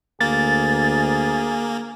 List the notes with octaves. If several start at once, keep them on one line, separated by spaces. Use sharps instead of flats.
D2 A#3 G#4 A6